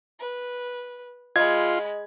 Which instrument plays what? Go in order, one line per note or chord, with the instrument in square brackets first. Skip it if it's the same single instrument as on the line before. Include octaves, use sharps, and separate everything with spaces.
[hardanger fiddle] B4
[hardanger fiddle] G#3 B5 [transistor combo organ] F4 [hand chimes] D#5 [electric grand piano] G#6